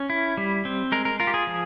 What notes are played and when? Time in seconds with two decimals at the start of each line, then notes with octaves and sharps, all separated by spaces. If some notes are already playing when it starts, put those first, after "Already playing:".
Already playing: C#4
0.10 E4
0.37 G3
0.65 C4
0.92 G#3 A#4
1.05 A#4
1.20 F4 A#4
1.27 G4
1.34 G#4
1.47 F3